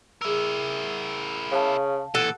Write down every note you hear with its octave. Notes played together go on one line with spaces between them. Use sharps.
E4 G#4 A#4 E6
C#3 F5 A5
A#2 E3 A4 F#5 F#6